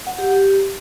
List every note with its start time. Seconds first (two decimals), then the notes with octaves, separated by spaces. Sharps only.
0.07 F#5
0.18 G4
0.30 G4